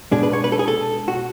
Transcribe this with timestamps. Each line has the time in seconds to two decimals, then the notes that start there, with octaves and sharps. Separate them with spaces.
0.11 B2 G#3 D4 G#4
0.23 B4
0.33 C#5
0.44 B4
0.52 A4
0.59 G#4
0.68 A4
1.08 F#4